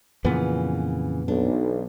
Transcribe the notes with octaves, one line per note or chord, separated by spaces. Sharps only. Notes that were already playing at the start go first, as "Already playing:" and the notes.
F2 A#2 C#3 E3 B3
B1 D4